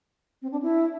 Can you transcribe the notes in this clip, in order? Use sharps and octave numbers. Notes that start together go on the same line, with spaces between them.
C4
D4
E4